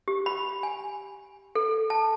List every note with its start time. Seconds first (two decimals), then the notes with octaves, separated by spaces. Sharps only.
0.08 G4
0.26 B5
0.63 G#5
1.55 A4
1.90 A5